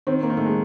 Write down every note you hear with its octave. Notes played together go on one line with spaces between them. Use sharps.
D#3 C4
A#3
D#3
A3
G#3